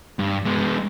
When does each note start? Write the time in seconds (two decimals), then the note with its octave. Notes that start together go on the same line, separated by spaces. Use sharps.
0.19 G2
0.45 G#3 B3